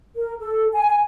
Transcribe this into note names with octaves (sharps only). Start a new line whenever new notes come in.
A#4
A4
G#5